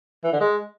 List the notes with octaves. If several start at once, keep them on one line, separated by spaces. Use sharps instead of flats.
E3
D3
G#3